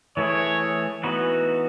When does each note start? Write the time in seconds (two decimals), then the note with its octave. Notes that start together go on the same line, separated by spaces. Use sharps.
0.17 E3 A3 E4 G#4 C#5
1.03 E3 B3 D#4 F#4 B4